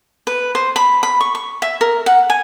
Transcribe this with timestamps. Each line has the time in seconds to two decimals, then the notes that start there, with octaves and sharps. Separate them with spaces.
0.27 B4
0.55 C5
0.76 B5
1.03 B5
1.21 C#6
1.35 C#6
1.62 E5
1.81 A#4
2.06 F#5
2.30 G#5